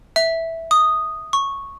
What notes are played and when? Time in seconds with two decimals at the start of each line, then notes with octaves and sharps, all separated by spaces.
0.16 E5
0.71 D#6
1.33 C#6